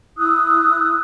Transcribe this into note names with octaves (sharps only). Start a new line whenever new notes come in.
E4 D#6 E6 F#6